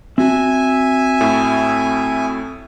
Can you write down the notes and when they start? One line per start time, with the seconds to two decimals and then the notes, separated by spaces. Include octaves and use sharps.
0.18 C4 F#4 E5 G#5 A5
1.21 A2 A3 E4